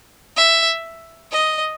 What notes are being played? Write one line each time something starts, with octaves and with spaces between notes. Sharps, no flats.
E5
D#5